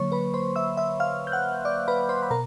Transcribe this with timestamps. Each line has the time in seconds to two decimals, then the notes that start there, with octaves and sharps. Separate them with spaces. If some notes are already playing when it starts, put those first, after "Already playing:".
Already playing: D3 F#3 A#3 C#5 C#6
0.12 B4 B5
0.34 C5 C6
0.56 E5 E6
0.77 E5 E6
1.00 F5 F6
1.27 G6
1.32 F#5 F#6
1.65 D5 D6
1.88 B4 B5
2.09 C5 C6
2.23 B5
2.31 B2 A#4 A#5